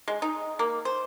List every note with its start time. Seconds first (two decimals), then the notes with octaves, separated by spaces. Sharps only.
0.08 G#3
0.22 D#4
0.59 A#3
0.85 C5